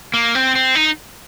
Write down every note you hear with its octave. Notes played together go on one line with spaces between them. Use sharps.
A#3
C4
C4
D#4